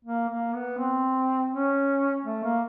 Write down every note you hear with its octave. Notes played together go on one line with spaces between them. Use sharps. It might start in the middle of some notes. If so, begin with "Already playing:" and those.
A#3
A#3
B3
C4
C#4
A3
A#3